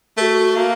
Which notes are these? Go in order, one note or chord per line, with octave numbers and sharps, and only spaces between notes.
A3 F#4 A#4
A#3